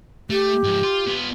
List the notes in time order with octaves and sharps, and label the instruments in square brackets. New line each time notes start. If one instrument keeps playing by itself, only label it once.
[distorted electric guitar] A3 [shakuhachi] G4
[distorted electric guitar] G#2 F3
F4
B3 F4